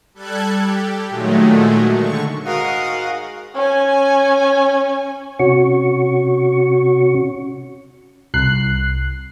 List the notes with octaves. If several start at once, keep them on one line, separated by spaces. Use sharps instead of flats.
G3 A4 F#6 G#6
G4
A#2 D#3 F#3 G#3 A3
D3 C#6
G#2 F#4 A#4 D#5 F5 F#5 D#6
C#4 G#5
C3 C#4 F#4 C#6
C2 F#6 C7